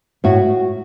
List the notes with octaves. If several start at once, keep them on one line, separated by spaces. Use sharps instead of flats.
A2 F#4